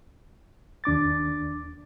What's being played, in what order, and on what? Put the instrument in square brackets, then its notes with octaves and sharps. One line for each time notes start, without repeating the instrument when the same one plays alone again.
[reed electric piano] D#2 D4 D6 A6